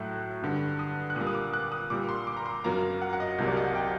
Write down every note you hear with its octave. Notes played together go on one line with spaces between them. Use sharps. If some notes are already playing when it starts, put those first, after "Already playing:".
Already playing: A2 F#3 A3 F#6
G2 D3 G3
D#6
F#6
A#2 G3 A#3 D#6
D#6
D6
F#6
D6
D#6
A#2 G3 A#3 D6
C6
D6
A#5
C6
F#2 F#3 A#3 A#5
F#5
F#5
D#5
C2 C3 F#3 A#3
D5
D#5
F#5
G5